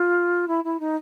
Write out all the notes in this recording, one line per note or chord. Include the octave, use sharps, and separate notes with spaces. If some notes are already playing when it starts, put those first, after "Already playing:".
Already playing: F4
E4
E4
D#4